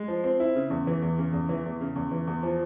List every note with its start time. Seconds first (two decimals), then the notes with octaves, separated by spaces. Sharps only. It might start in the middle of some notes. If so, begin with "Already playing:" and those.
Already playing: G#3
0.08 F3
0.24 C4
0.40 E4
0.56 C#3
0.70 E2
0.87 E3
1.02 E2
1.18 C#3
1.33 E2
1.49 E3
1.66 E2
1.81 C#3
1.96 E2
2.11 E3
2.27 E2
2.43 F3